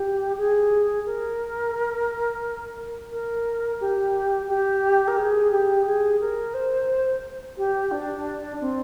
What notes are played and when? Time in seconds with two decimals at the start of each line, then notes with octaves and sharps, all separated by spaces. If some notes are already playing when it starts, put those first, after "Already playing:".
Already playing: G4
0.38 G#4
1.06 A#4
3.11 A#4
3.81 G4
4.49 G4
5.08 A#4
5.17 G#4
5.52 G4
5.86 G#4
6.20 A#4
6.54 C5
7.57 G4
7.91 D4
8.61 C4